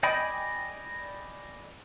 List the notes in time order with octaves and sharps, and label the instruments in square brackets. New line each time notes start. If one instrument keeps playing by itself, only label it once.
[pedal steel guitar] D5 D#5 G5 G#5 B5